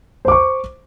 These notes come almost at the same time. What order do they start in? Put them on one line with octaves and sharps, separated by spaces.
C5 D6 C#6